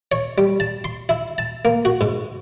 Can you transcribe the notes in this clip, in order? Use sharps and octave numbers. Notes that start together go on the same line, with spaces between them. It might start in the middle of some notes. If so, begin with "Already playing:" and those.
C#5
G3
A5
C6
E4
A5
A#3
F#4
G#2